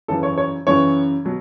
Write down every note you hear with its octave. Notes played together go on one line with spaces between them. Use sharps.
F#2 C#3 E3 A4
C#5
C#5
F#2 C#3 E3 C#5
B2 F#3